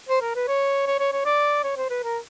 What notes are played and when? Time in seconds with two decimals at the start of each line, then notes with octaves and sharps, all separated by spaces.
0.09 C5
0.22 A#4
0.35 B4
0.48 C#5
0.86 C#5
0.99 C#5
1.12 C#5
1.25 D5
1.64 C#5
1.77 C5
1.90 B4
2.03 A#4